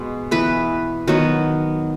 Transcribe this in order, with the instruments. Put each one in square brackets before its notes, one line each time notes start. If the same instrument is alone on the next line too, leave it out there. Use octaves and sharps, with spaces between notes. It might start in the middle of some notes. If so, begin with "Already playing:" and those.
Already playing: [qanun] B2 G#3 B3
E3 B3 B4
D#3 F#3 B3